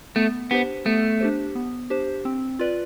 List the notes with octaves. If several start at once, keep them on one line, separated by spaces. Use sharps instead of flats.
A3 B3
B3 D4 G4 C5
A3 B3
D4 G4 C5
B3
D4 G4 C5
C4
F4 B4 D5